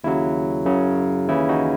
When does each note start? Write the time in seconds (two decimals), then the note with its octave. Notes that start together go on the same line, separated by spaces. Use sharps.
0.04 D#2 C#3 F#3 E4
0.65 F#2 C#3 F#3
1.28 D#2 C#3 E3 E4
1.49 D#4 F#4